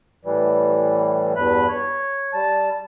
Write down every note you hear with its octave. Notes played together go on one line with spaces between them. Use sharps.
A2 E3 G3
E2 G2 B4 B5
C#5
G3 A5